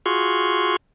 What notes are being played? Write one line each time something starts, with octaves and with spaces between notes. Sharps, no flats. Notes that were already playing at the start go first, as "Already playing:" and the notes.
F4 F#4 G#4 C6 C#6